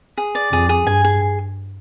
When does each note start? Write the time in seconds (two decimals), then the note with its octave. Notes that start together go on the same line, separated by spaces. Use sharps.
0.18 G#4
0.35 D5
0.52 F2 G#4
0.69 G#4
0.87 G2 G#5
1.05 G#4